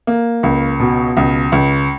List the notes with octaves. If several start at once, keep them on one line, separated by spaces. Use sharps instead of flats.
A#3
C#2
B2
C#2
C#2